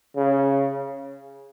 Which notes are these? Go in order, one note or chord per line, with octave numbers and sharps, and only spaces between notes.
C#3